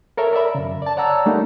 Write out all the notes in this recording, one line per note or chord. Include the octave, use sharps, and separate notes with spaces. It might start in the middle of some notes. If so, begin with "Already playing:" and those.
A4 A#4 C#5 E5
A#4 D5 E5 B5
F#2 C#3
D5 A5
C#5 D5 F#5 A5 A#5 E6
G3 A3 A#3 D4 D#4